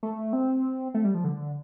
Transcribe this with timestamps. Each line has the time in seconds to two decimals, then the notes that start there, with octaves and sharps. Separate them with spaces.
0.03 A3
0.33 C4
0.94 A3
1.05 G3
1.14 F3
1.24 D3